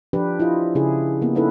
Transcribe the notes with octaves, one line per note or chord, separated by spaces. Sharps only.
F3 D4 G4 B4
E4 F4 D#5
C#3 E4 G#4
A#3 B3
C#4 D#4 E4 A4 B4